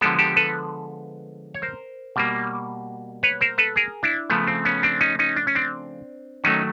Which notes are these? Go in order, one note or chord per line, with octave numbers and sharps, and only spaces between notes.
D3 F3 G#3 B3 G4 A4
G4 A4
A4 B4
C#5
A#4 C5
B2 G3 A#3
B4 C#5
A#4 C5
A4 B4
G#4 A#4
D4 E4
C#3 F3 A3 B3
C4
B3 C#4
C4 D4
C#4 D#4
C#4 D#4
D4
C#4
C4 D4
D#3 F#3 A3 C#4 D#4